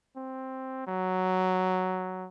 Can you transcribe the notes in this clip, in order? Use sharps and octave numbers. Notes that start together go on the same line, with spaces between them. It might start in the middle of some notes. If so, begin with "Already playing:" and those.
C4
F#3